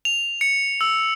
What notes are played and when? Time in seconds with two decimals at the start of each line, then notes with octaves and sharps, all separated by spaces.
0.05 F7
0.41 C#7
0.81 E6